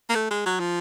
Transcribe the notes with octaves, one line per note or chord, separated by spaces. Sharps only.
A#3
A3
G#3
F#3
F3